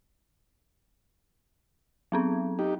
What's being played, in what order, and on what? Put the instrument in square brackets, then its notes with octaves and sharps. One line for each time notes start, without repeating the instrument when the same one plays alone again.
[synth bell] F#3 B3 C4
[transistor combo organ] D#4 G4